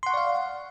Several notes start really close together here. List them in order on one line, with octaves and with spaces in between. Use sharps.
C6 F#5 C#6 D5 F5